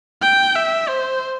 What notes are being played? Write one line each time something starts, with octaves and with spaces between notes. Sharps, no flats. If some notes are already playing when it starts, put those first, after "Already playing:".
G5
E5
C5